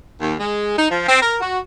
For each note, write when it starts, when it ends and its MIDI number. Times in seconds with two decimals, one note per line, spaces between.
0.21 0.34 39
0.40 0.78 56
0.78 0.87 63
0.89 1.06 53
1.08 1.21 60
1.22 1.36 70
1.41 1.59 66